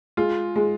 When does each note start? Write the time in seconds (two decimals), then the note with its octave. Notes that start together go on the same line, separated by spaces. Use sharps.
0.17 G#3 F4
0.56 G#3